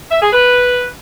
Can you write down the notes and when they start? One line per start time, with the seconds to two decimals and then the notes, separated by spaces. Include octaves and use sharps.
0.11 E5
0.21 G#4
0.32 B4